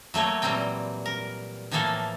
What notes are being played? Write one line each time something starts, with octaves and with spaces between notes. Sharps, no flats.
F#3 A3 A#3 C#5
A#2 E3 F#3 G3 C4 G5
A#4
A2 E3 F3 A#3 A4 F5